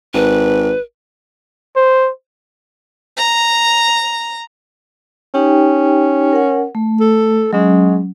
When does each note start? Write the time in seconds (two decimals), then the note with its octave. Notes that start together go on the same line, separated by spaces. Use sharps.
0.14 G#1 B4
1.76 C5
3.17 A#5
5.34 C#4 D#4 G4 G5
6.33 A#4 F#5
6.75 A3
7.00 A4
7.53 F#3 G#3 C#4